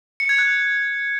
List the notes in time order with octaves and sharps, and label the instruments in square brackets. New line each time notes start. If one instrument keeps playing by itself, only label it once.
[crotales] C#7
G#6
F#6